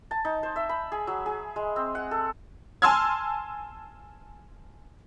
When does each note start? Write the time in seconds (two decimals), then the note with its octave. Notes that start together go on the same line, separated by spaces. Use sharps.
0.11 A5
0.25 D#4
0.43 C5
0.56 E5
0.69 B5
0.92 G#4
1.07 F#3
1.26 G#4
1.56 G#3
1.76 C4
1.95 F#5
2.11 A4
2.82 G#5 A5 C6 E6 F6 G#6